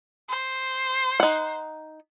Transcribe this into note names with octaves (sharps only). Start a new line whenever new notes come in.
C5
D#4 F#5